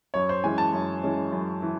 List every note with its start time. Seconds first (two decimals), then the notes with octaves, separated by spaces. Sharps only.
0.14 F#2 C#5
0.29 C5
0.44 E3 G#3 C#4 G#5
0.58 A5
0.73 F#2
1.03 E3 G#3 C#4
1.32 F#2
1.62 E3